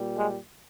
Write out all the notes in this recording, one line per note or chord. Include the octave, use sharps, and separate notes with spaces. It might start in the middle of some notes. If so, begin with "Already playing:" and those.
Already playing: A#2 G3
G#3